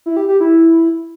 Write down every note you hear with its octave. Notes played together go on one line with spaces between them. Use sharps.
E4
G4
G4
E4